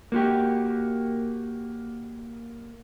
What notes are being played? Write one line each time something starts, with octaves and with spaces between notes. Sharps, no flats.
A#3 F#4 G4